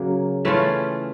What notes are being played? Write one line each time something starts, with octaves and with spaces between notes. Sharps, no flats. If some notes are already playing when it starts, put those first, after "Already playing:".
Already playing: C#3 F#3 A#3
E3 A3 C#4 F4